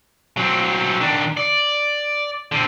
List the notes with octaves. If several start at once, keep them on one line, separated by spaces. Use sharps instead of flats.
F#3 C4
D#3 D4
D5
D3 C4